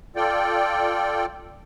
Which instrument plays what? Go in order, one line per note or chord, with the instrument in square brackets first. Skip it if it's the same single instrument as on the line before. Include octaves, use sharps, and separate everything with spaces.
[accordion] F4 A4 D5 G5